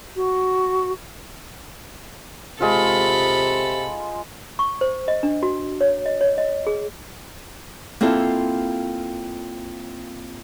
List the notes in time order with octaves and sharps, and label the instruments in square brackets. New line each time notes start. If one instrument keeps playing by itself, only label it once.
[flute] F#4
[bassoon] C3 [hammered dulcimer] G#3 F4 [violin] A4 B5
[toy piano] C#6
C5
D#5
D4
F#4
C#5
D#5
C#5
D#5
G#4
[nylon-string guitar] A#3 C4 E4 F4 A4 F#5